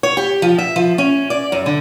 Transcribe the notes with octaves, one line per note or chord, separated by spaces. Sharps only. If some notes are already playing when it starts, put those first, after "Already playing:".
C#5
G4
F3
E5
F3
C#4
D5
F#2
D3